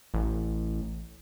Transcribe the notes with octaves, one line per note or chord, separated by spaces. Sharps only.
A1